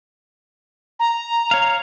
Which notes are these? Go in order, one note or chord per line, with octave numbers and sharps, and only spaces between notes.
A#5
C#5 F5